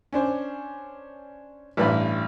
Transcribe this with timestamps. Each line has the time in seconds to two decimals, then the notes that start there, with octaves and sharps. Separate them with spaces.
0.13 C#4 D4 C5
1.77 A1 G2 D4 B4 D5 B5